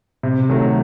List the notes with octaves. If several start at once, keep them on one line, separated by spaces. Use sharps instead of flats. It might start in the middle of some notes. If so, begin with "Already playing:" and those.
C3
D#3 F#3 A3